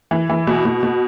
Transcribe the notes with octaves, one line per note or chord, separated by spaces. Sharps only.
E3
E3
B2
B2
B2